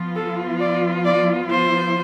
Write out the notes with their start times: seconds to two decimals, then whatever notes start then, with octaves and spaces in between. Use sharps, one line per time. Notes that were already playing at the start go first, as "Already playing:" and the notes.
Already playing: F3 B3 F4
0.16 A4
0.61 D5
1.05 D5
1.50 C5